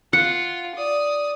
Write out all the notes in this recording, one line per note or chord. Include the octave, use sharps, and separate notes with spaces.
F4 F#5
D5 D#6